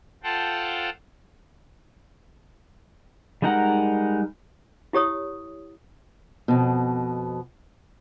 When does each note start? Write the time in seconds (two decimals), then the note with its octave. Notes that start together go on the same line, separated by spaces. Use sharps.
0.23 F4 A4 C5 F#5 G5 A5
3.42 G3 G#3 D#4 A#4 F#5
4.93 E4 G4 C#5 D#6
6.48 F2 B2